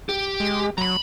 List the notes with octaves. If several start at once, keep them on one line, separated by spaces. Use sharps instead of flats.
G4
G#3
F#3 A#5 B5